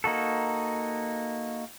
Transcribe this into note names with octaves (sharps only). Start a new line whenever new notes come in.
A#3 D#4 F#4 A4